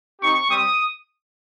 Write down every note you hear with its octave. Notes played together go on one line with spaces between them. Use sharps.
C4 D#4 G4 C#6
G3 C4 G4 D#6